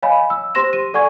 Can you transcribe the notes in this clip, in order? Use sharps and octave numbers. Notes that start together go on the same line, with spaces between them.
C#5 D#5 F5 G#5 B5
E6
G4 C5 C6 A#6 E7
D#7
A4 D5 F#5 G#5 C#6 G#6